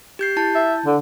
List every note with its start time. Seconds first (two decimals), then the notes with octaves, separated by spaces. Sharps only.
0.19 G4 G6 C7
0.37 E4 A5 G6
0.55 E5
0.86 D3